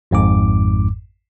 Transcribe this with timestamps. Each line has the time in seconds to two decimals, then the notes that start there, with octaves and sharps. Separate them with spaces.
0.11 G#1 F2 G#2 D6